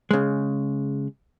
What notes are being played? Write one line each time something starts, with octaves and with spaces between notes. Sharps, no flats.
C#3 G#3